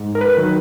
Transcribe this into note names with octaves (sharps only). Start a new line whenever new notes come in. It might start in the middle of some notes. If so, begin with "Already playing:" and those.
Already playing: G#2
A#4
B4
D#3 F#3